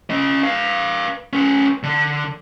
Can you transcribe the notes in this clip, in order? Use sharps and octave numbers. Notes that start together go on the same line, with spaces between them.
C#4 D#5
B4 F5
C#4 B4
D3